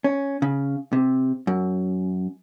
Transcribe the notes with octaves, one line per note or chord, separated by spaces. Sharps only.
C#4
C#3
C3
F#2